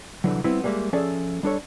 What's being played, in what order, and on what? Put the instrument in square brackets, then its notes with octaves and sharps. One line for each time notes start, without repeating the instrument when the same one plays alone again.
[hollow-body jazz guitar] C2 D3 E3 F#3
G3 B3 C4 E4
G3 G#3 A#3 E5
F3 C#4 G#4 A4 D5 E5
G3 D4 A4 C#5